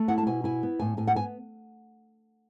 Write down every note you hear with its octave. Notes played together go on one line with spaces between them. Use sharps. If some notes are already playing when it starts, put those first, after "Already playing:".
Already playing: A3
E4 F#5
A5
B2 G#5
E4 G#5
B3
A2 G#5
A2 G#5
F#5
B3 G#5